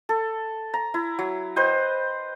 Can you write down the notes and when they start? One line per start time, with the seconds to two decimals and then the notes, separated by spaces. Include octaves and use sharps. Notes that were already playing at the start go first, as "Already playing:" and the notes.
0.09 A4
0.74 A#5
0.94 E4
1.19 F#3
1.56 B4 C5 D#5 G5